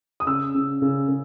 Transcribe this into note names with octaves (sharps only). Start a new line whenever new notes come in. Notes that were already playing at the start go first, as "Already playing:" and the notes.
D#6
C#3 E6
C#3
C#3
C#3